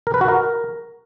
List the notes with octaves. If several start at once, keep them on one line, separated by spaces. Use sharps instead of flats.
A#4
B4
F#4
A#4